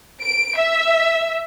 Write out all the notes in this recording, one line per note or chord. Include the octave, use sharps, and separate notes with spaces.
D7
E5